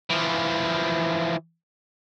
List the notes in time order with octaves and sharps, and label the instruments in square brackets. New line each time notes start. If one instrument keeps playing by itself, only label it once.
[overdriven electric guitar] E3 F3